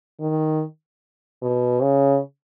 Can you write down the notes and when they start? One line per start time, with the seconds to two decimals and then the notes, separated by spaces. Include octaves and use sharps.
0.20 D#3
1.42 B2
1.82 C#3